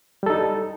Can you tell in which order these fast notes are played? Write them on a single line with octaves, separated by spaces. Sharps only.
G3 A4 D#4